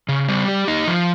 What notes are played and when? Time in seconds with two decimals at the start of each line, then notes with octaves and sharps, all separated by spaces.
0.09 C#3
0.29 G3
0.48 G4
0.68 D#4
0.87 F3